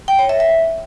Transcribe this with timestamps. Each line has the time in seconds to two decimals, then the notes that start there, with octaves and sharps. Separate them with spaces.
0.08 G5
0.19 C#5
0.29 E5
0.40 E5